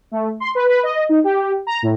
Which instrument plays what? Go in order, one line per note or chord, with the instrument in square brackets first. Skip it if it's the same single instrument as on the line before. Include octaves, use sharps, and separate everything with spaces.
[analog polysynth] A3
C6
B4
B4
D#5
D#4
G4
A#5
A2